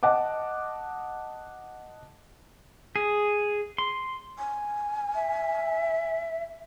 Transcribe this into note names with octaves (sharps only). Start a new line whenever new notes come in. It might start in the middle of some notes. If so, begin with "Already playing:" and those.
D#5 F#5 A5 D6
G#4
C6
G#5
E5